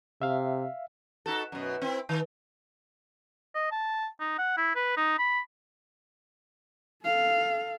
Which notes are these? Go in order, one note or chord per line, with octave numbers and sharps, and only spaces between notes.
C3 E5 F5
D#4 F#4 A4
F#2 B2
C4 E4
D#3
D#5
A5
D#4
F#5
E4
B4
D#4
B5
A4 F5